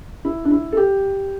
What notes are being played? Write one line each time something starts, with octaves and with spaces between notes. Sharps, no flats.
E4
D4
E4
A4
G4